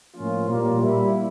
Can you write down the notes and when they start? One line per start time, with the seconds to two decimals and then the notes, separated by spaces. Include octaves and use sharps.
0.16 A2 F3 A#3 C#4 F4
0.48 A#2 G3 A#3
0.80 G3 A#3 E4